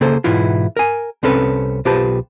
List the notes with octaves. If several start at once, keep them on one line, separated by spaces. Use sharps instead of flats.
C#3 A#3 A4 C5
G#2 B2 E3 B3 E4 F4
A#4 G#5
C2 C4 C#4 A4 B4
B1 F4 G4 B4 C5 A5